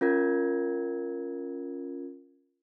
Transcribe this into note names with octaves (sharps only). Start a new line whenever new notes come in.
C#4 F4 A#4 G#6